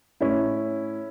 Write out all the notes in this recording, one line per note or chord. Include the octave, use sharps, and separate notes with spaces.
A2 C#4 E4